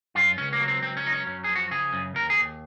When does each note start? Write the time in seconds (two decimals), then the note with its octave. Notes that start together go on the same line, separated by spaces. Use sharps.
0.15 F#2 F4
0.38 C#2 C#4
0.53 A#3
0.60 F#3
0.68 C4
0.82 C#2 C4
0.97 C#4
1.04 F#3 D#4
1.12 C#4
1.27 F#2 C#4
1.44 F3 G#4
1.56 F#4
1.71 C#3 G#4
1.93 F#2
2.15 D#2 A#4
2.30 G#4
2.37 D#2